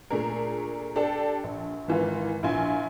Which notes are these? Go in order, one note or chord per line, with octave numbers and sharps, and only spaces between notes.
A#2 A3 D4 G#4 A#4
D4 G4 A4 D5 A5
A#1
G#1 E3 F4 B4
A#1 E4 F4 G#5